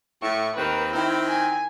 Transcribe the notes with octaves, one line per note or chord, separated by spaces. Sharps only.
A2 C#6
D#2 D#3 C4 A#4 B4
D#3 C4 E4
G#5